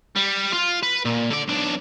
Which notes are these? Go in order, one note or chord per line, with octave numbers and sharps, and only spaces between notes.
G3
F4
B4
A#2
D3 D5
B1 D4